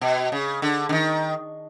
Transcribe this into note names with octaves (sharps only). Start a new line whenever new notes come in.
B2
C#3
D3
D3
D#3